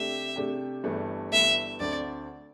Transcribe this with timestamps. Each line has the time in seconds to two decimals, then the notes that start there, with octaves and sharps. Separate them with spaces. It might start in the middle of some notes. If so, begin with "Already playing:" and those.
Already playing: C3 A3 D4 G4 E5
0.36 C3 A3 D4 G4
0.84 G1 G2 E3 A3
1.32 G1 G2 E3 A3 E5
1.80 D2 D3 C4 A4 C5 D5